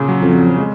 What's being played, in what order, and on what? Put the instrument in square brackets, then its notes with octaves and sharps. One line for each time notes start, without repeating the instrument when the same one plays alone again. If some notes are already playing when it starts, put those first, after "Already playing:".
Already playing: [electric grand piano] A#2 C#3
F#3
[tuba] F2
[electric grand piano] F#3
G#3